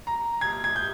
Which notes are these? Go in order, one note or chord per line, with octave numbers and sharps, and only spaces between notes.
A#5
G#6
G#6
G6